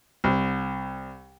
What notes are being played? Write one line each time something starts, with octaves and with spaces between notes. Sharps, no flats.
C2